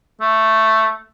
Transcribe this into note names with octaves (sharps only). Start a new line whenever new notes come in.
A3